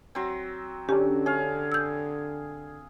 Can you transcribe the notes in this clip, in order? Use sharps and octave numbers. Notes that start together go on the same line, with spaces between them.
F#3 C4
D3 C#4 D4 G4
G#4 C#5 F5
E6 G6